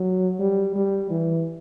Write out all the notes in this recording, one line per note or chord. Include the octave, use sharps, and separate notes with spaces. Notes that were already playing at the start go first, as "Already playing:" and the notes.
Already playing: F#3
G3
G3
E3